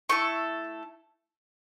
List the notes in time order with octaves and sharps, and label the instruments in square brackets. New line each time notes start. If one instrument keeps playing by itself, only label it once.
[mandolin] A3 E4 A4 C#6